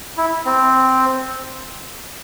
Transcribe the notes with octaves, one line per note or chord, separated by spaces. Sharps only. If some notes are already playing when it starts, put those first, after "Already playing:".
E4
C4